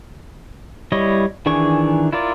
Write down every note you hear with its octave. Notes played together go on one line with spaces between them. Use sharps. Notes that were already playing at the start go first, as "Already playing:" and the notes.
G3 E4 C#5 D#5
D#3 E3 D4 G#4 C#6
E4 F4 A#4 D5